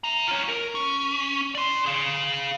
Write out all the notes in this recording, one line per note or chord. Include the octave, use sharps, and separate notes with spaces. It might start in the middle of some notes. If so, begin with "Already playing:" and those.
E5 A#5
F4 C#5
A#4
C#4
D5 C6
G#4 F5